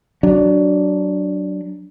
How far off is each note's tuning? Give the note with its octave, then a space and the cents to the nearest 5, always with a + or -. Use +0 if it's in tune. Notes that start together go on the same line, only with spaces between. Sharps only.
F#3 +20 D4 +0